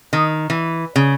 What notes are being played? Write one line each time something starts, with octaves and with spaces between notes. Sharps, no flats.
D#3
E3
C#3